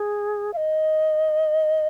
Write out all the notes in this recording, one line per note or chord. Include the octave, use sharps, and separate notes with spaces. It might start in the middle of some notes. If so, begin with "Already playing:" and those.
Already playing: G#4
F5
D#5